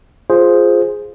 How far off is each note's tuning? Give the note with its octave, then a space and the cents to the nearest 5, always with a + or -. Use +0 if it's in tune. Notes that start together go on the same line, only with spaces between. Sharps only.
F4 +0 G#4 +0 C5 +0